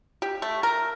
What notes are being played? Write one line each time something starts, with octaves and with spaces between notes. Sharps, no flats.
G4
A3
A#4